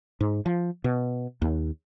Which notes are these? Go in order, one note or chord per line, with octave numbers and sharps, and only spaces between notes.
G#2
F3
B2
D#2